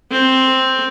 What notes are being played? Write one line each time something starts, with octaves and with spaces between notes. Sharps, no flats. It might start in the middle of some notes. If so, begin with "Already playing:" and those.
C4